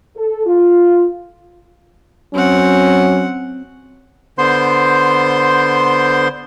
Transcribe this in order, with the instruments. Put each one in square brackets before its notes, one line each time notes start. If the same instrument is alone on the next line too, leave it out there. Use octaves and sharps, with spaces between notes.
[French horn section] A4
F4
[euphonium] F#3 [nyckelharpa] C4 F#5 [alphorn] C#4
[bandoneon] D3 B3 C5 C6 G6